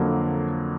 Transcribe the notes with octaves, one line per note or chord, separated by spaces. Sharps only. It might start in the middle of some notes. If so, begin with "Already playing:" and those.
Already playing: F2 D3 F#3 A#3